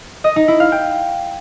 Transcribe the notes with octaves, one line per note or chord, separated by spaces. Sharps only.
D#5
D#4
E4
F5
G5